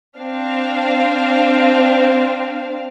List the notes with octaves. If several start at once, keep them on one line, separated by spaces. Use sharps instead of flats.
C4 D4 F5